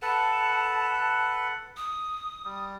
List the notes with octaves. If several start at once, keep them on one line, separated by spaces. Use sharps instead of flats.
A4 B4 F#5 A5
D#6
G3